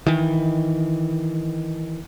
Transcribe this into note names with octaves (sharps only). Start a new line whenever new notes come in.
D#3 E3